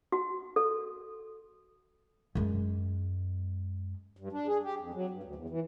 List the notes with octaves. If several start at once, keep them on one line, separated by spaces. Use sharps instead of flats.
F#4
A4
F#2 G#3
G2
D4
G#4
G4
F2
F#3
G2
D2
E2
E3